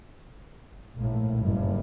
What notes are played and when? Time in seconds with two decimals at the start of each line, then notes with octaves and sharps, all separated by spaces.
0.95 A#1 A2
1.39 F#1 G2